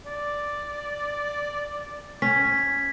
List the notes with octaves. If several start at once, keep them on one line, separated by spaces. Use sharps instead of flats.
D5
C#4 G#6 B6